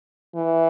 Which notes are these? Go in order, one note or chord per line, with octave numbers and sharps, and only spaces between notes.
E3